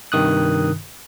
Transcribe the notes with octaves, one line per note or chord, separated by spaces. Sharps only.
G2 C3 D#3 D#6 F#6